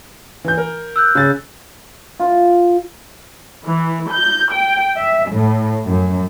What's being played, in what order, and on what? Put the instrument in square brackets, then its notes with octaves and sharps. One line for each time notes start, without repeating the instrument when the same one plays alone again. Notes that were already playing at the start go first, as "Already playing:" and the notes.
[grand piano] E3 G6
A#4
[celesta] E6 F#6 G6
[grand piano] C#3 A6
[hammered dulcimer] F4
[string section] E3
G6
G5
E5
A2
F#2